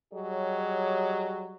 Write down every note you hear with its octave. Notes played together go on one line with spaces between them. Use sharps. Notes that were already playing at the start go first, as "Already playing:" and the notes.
F#3 G3 G4 G#4 C#5 D#5